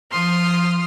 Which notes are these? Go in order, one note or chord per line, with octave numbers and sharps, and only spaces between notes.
F3 C6 D#6 F6